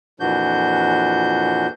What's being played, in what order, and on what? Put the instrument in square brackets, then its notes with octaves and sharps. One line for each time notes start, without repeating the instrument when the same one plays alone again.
[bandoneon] F2 A#2 E3 D4 F#4 G6